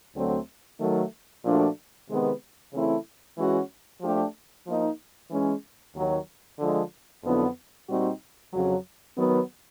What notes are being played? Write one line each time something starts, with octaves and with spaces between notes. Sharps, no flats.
D2 D3 F#3 A3 C4
D#3 F#3 A3
A#2 F3 A3 D4 F#4
C3 D#3 G#3 B3
C#3 E3 A3 C4 E4
E3 G#3 C#4 F#4
F3 A3 D4 G4
F3 A#3 D#4
E3 G#3 C#4
D#2 D#3 F#3
D3 F3 G#3
F2 D3 F#3 B3 E4
A#2 G3 C4 D#4 F#4
F2 C#3 F#3
D#3 F#3 B3